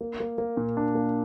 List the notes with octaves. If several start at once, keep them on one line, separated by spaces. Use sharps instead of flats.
A#3
A#3
A#3
A#2
D4
A#3